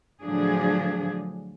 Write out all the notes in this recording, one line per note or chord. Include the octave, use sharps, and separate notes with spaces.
A2 D3 F3 F#3 D4 G#4